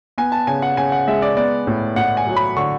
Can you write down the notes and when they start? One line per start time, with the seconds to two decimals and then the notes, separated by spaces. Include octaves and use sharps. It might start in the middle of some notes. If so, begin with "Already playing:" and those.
0.18 B3 G#5
0.32 A5
0.47 C#3 G#5
0.62 F#5
0.77 C#3 G#5
0.92 F#5
1.08 G#3 E5
1.22 D5
1.37 B3 D5
1.67 A2
1.96 A2 F#5
2.17 G#5
2.27 F#3
2.36 B5
2.56 D3 C#6